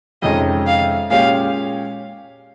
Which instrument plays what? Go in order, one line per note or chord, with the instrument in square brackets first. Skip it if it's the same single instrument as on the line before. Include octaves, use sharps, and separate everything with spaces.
[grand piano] F2 C3 D#3 G#3 C#4 [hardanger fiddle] D#5
[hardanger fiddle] F5
[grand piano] A#2 G#3 C#4 G4 [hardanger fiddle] F5